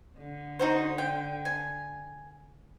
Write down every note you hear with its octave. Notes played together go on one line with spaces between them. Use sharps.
D3
D#4 F#4 C5
G5
G#5